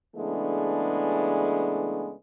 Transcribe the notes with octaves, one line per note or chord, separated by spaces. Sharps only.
C#3 E3 G#3 A3 B3 D4